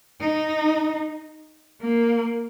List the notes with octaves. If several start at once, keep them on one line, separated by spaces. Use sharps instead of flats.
D#4
A#3